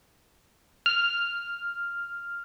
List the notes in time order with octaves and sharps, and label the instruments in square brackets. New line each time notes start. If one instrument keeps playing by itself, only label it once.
[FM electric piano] F6